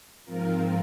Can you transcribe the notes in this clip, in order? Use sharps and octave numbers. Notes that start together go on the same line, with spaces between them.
G#2 F3 C4 F4 A#4